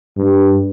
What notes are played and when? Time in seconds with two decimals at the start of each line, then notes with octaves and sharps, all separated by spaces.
0.17 G2